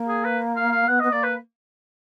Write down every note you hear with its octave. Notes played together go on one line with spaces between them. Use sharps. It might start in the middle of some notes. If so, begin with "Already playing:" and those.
Already playing: A#3
G#4
B4
F5
F5
B3 F#5
B3 D#5
A#3 D5
B4